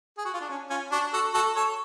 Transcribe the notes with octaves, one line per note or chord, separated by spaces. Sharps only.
G#4
F#4
F4
D4
C#4
C#4 F4
D4 F#4
F#4 A4
F#4 A4
A4 C#5